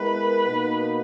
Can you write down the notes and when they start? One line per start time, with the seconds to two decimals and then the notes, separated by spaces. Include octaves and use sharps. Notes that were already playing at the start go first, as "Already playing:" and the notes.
Already playing: G#3 B3 E4 A#4 B4
0.46 B2 A#3 D#4